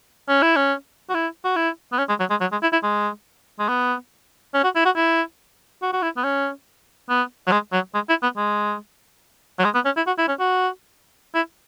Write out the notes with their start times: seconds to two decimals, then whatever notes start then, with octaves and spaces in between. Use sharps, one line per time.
0.28 C#4
0.42 E4
0.56 C#4
1.09 F#4
1.14 E4
1.44 F#4
1.56 E4
1.92 B3
1.98 C#4
2.09 G#3
2.20 F#3
2.30 G#3
2.41 F#3
2.52 G#3
2.62 E4
2.73 E4
2.83 G#3
3.59 G#3
3.68 B3
4.54 C#4
4.64 F#4
4.76 E4
4.85 F#4
4.96 E4
5.82 F#4
5.93 F#4
6.02 E4
6.17 B3
6.24 C#4
7.09 B3
7.47 F#3
7.51 G#3
7.72 F#3
7.94 G#3
8.09 E4
8.23 B3
8.37 G#3
9.59 F#3
9.64 G#3
9.74 B3
9.85 C#4
9.97 E4
10.07 F#4
10.18 E4
10.28 C#4
10.39 F#4
11.35 E4